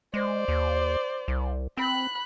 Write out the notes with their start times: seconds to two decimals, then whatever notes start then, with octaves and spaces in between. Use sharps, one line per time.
0.14 G#3 C5 D5
0.48 D#2
1.28 C2
1.77 C4 B5 F#6